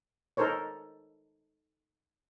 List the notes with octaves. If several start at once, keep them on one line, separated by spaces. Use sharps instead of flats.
D#4 A4 A#4 C5 C#5